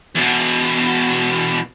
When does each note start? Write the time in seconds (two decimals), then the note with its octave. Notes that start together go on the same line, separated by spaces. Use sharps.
0.15 E2 B2